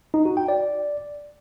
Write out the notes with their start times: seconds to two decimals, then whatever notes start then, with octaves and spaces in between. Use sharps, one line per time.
0.14 D#4
0.25 F#4
0.37 G5
0.48 D5